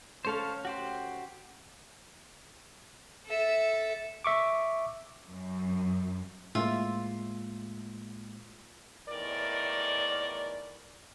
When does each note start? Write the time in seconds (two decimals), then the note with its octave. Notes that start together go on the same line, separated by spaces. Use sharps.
0.25 D2 C#4 A4 C5 C#5 F5
0.65 F#4 G4 C5
3.26 A4 E5
4.24 E5 C#6 D6
5.29 F#2
6.55 A2 G#3 A#3 F4 E5
9.09 E2 A2 D#3 A#4 D5